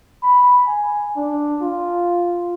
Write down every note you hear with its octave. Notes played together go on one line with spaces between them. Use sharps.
B5
G#5
D4
F4